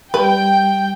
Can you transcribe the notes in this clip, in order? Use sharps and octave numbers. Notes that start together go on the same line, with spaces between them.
G3 B4 G5